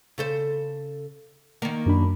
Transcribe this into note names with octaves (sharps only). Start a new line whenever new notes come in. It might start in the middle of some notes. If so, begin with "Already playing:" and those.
C#3 A4 C5
D#3 A#3
F#2 D4 B5